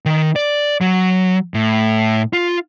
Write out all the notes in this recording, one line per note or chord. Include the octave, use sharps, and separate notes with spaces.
D#3
D5
F#3
A2
F4